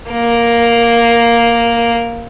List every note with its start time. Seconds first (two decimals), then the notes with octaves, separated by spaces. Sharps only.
0.10 A#3 A#4